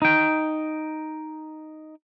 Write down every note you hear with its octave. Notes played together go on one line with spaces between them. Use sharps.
D#4 G5